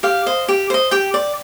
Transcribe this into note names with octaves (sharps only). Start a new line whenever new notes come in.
G4 F5
C5 D#5
G4
C5 D#5
G4 G5
D5